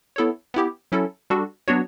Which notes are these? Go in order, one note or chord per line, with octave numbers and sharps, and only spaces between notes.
B3 E4 A4 C#5
B3 E4 G4
F#3 C#4 E4 A4
G3 D4 F#4 A4
F#3 B3 D4 F#4 C#5